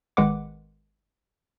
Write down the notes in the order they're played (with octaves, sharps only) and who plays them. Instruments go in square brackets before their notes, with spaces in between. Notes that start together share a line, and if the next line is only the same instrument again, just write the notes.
[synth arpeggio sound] G#1 D#3 G#3 B4 F#5 D6